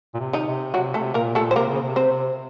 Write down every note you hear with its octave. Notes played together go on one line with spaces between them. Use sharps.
A#2
C3
D#3 D#4
C3
C3 F#3 F#4
C3 A3 A4
A#2 A#3 A#4
A#2 A3 A4
C5
C3 A#3 A#4
C#3
C3
C4 C5